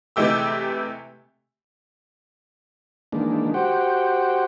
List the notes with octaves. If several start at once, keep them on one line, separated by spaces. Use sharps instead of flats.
C3 E3 G#3 A3 G4 E6
D#3 E3 G#3 A#3 D4
F#4 G4 C5 F#5 G5